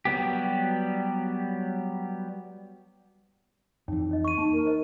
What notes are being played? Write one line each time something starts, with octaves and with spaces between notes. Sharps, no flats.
F#3 G3 B3 G4
F2 E3 D#4 C#5 G5
D#4 C#5 D#5
C#6 D#7
A#3 D#4 A5
A#4
C5 D#5